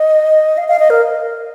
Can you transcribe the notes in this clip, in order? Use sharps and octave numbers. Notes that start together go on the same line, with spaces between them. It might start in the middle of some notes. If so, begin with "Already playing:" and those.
Already playing: D#5
F5
F5
D#5
A#4